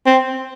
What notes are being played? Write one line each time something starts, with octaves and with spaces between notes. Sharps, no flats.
C4